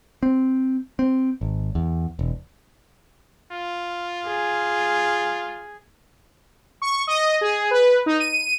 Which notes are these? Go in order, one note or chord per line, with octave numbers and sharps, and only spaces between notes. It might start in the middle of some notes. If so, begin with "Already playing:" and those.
C4
C4
G#1
E2
E1
F4
G#4
C#6
D#5
G#4
B4
D#4
D#7